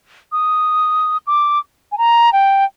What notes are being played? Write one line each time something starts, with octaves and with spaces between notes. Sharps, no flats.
D#6
D6
G#5
A#5
G5